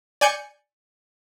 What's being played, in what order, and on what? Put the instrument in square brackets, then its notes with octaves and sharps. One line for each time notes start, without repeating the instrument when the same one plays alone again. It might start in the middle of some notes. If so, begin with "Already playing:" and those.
[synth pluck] D5 G#5 G6 C#7